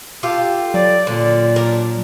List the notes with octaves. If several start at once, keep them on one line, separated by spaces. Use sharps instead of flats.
F4 G4 A4
F#3 D5
A#2 D3
D4 A#4